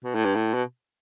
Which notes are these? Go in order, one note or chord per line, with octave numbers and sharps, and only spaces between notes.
B2
A2
G2
A2
B2